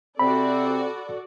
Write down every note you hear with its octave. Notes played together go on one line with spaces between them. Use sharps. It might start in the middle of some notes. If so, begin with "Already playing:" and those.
C3 C4 F#4 A4 D5 B5